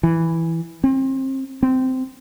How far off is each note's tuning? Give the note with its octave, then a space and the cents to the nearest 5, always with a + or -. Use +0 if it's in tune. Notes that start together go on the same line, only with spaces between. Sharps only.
E3 +0
C4 +30
C4 -15